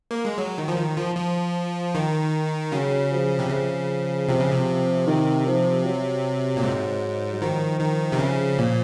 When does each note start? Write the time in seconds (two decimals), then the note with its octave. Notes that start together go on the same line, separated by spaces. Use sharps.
0.11 A#3
0.25 G#3
0.38 F#3
0.58 D#3
0.68 F3
0.77 D#3
0.97 F3
1.16 F3
1.95 D#3
2.72 C#3 F#3
3.11 F3
3.39 C3
3.50 C#3 F3
4.29 C3 F3
4.40 C#3
4.52 C3
5.07 D#3
5.46 F3
5.85 F#3
6.57 A#2
6.63 G#2
7.32 F#3
7.41 D#3 F3
7.80 D#3
8.12 C3
8.19 C#3
8.58 A#2